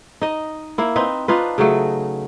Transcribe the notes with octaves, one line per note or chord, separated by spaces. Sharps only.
D#4 D#5
A#3 E4
C4 D#4 B4
D4 D#4 F4 B4
C#3 F#3 A3